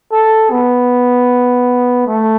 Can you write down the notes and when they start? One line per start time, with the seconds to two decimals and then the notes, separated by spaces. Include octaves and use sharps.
0.12 A4
0.51 B3
2.07 A3